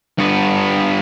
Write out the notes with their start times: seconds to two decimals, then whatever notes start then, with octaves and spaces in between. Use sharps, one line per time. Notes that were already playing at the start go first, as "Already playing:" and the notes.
0.19 G2 B3